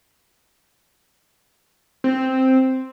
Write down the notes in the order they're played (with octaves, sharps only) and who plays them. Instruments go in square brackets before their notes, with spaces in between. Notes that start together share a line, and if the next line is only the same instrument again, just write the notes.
[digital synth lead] C4